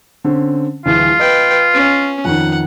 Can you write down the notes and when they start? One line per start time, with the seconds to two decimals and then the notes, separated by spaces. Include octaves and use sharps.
0.24 D3 C4 C#4
0.86 D1 E3 F4
1.20 B4 D#5 G5
1.74 C#4
2.25 F2 D#3 F#5